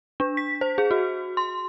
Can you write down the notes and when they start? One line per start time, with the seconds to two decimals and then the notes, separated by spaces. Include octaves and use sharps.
0.20 D4
0.37 B6
0.61 C5
0.78 G#4
0.91 F#4
1.37 C6